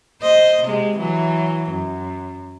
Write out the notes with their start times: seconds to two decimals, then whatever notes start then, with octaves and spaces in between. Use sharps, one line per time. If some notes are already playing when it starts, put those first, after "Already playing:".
0.22 C5 D#5
0.64 C3 G#3
0.98 E3 F#3
1.71 F#2